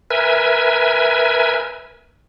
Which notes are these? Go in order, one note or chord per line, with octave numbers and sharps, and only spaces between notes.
A#4 B4 E5 G#5